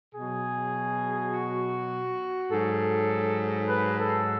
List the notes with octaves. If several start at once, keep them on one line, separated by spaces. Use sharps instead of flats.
B2 F#3 G#4
F#4
G#2 F#3 A4
B4
A4